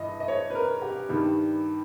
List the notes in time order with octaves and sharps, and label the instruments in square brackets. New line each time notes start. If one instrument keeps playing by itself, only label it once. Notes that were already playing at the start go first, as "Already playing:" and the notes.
Already playing: [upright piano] G2 E3 D#5
D#5
C#5
B4
A#4
G4
G2 D#3 G3